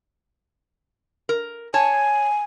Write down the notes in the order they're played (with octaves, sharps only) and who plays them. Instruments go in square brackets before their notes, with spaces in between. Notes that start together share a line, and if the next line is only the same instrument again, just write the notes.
[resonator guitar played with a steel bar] A#4
[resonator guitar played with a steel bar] C#5 A5 [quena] G#5